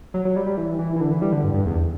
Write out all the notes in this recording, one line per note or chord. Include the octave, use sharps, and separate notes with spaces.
F#3
F#3
G3
G3
E3
E3
E3
D3
E3
G3
D3
G2
G2
E2